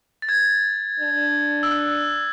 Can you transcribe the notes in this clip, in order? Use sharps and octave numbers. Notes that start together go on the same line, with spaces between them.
A6
G#6
D4
E6
F#6